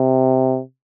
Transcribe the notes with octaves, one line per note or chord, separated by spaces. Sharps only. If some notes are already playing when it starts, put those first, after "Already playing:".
Already playing: C3